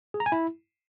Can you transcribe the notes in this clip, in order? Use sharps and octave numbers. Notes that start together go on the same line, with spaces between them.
G#4
A#5
G#5
E4